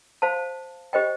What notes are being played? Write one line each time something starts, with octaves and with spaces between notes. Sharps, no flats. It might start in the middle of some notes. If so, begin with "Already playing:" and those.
C5 F5 A5
G4 C5 D#5 G5